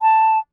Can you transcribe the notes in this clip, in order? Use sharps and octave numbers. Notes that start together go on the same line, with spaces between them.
A5